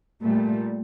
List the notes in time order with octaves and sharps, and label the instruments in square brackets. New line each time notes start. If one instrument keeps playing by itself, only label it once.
[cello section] A#2 G3 A3